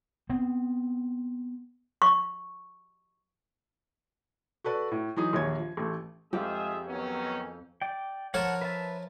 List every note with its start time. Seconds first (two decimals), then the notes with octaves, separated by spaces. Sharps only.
0.30 B3 C4
2.02 C#6
4.64 F#4 A4 B4 D5
4.92 A2
5.16 E3 F#3 D#4 G#4
5.33 A#1 D#2 C#5 G#6
5.58 F3
5.77 A1 A3
6.33 F2 G#3 F4 G4 G#4 E5
6.88 D#3 F#3 B3 C#4
7.82 D5 G5
8.34 F3 A#4 C#5 F#5 A5
8.62 B4 E5 A5